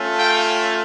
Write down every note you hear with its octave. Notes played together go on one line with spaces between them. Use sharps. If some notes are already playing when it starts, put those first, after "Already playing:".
Already playing: A3 C#4 F4
F5 G5